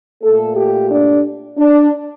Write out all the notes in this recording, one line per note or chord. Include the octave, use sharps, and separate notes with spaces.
A#2 A3 A4
G4
D4
D4